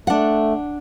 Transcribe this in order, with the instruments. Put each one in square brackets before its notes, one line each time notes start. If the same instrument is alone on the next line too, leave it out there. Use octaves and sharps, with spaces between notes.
[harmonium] A3 [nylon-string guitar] D4 F#5